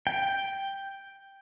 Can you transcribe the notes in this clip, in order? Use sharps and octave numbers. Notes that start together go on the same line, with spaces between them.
G5